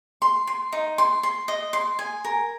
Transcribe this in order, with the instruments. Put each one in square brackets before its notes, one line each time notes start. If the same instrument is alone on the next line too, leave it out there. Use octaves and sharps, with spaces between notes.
[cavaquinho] C6
C6
D#4
C6
C6
D#5
C6
G#5
A#4